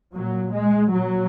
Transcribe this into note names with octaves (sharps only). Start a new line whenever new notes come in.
A#2 F#3
G#3
A#2 F#3